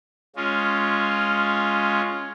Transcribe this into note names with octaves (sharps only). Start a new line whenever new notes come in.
G#3 C#4 F4